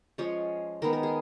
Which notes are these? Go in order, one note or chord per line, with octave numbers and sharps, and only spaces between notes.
F3 G#3 C#4 C#5
D#3 G#3 B3 A#4
A#4
G#4